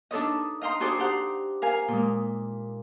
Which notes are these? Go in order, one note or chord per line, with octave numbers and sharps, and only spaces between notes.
D4 D#4 A4 B4 C#5 D#5
D#5 F5 G5 A#5 C6
F#4 G#4 A4 C5 D5
G4 C5 F#5 A#5
A#4 F5 G#5
A#2 G#3